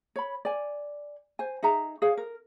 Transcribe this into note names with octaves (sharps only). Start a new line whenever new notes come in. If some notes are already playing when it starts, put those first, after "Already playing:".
C#5 B5
D5 G#5
C5 G#5
D#4 G#4 E5 A#5
G#4 C#5 F5
A#4